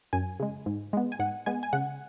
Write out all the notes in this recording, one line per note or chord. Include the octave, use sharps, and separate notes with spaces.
F#2 G#5
C#3 G#3
G#2
G#3 B3
G#5
G#2 F#5
G#3 B3 G#5
G#5
C#3 F#5